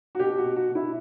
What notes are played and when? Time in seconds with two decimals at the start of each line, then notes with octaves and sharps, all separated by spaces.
0.15 F#4
0.19 B2 G4
0.38 F#4
0.44 B2
0.56 F#4
0.69 B2
0.75 E4